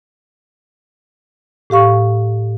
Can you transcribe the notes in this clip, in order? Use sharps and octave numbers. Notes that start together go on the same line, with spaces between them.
A2 G4 F5 C#6